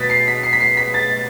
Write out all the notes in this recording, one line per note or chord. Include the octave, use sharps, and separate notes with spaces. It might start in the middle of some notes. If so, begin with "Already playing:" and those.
Already playing: B2 A6 B6
C7
B6
C7
B6
C7
B6
A6